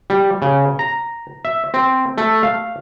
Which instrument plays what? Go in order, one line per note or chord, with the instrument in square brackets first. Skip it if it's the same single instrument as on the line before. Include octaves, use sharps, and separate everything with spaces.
[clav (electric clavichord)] G3
C#3
A#5
E5
C4
A3
F5